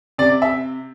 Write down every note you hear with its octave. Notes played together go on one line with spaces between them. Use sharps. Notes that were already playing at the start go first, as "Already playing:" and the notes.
C3 D5
E5